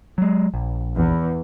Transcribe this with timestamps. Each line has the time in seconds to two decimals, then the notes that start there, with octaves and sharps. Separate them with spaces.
0.18 F#3 G#3
0.54 A#1
0.97 E2